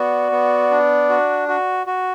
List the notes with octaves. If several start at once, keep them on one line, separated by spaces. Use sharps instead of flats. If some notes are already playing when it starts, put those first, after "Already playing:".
Already playing: B3 F#4 D5
B3
D4
F#4
F#4
F#4